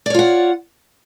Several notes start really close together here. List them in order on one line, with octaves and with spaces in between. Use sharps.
D5 C#5 F4 F#5